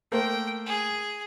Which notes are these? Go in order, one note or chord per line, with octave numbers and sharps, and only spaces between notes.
A3 A#3 C5 G5
G#4